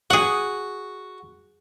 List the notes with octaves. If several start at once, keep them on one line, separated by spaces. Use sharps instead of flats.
F#4 G#4 F#5